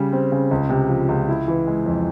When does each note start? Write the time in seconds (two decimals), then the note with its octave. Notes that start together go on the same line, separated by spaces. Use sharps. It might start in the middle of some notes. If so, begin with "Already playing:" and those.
Already playing: C#3 G3
0.13 C4
0.32 C#3
0.51 C#2
0.70 C3
0.89 F3
1.09 C#2
1.29 E4
1.48 E3
1.67 G#3
1.86 F2